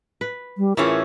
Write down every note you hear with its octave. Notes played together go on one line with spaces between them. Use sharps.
B4
G3
A2 E3 C#4 F4 G#4 A#4 E5